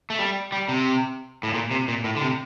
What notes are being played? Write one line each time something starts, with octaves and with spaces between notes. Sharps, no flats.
A3
G3
G3
C3
A2
A#2
C3
A#2
A2
D3
C3